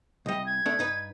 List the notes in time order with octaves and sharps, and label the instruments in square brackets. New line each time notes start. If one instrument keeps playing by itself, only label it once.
[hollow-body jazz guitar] C2 G3 [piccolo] D#5
[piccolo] G#6
[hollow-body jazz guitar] A3 B3 D4
G2 D#4 B4